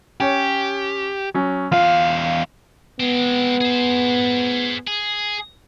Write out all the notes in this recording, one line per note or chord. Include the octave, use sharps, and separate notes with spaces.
C#4 G4 C#5
F#3 C#4
E2 F4 F5
G#3 B3 C4
G#4 C5
G#4